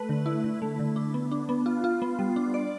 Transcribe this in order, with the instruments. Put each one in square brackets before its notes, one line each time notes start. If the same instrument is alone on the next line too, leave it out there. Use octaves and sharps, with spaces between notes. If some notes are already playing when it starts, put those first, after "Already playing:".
Already playing: [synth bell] A3 B4
D3
E4
D3
A3
D3
D4
B3
D4
B3
F4
F4
B3
G3
D4
D5